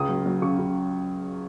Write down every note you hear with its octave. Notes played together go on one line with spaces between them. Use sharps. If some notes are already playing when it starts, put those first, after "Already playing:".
Already playing: C#2 C#3 D#6
F#3
F#3
C#3 C#6
C#3